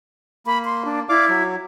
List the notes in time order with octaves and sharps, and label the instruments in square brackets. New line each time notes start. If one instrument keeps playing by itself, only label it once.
[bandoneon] A#3 [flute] B5
[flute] C6
D4
[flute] E4 [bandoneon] D5 F5 D6
[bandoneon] F#3